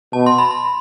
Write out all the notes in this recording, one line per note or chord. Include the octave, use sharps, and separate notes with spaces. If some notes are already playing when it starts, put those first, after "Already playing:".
B2 A5
C6
B5
C6